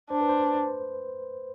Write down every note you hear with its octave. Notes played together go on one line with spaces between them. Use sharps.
D4 C5
B4
C5